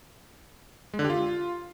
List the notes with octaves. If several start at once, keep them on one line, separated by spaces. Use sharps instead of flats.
G#3
D3
G4
F4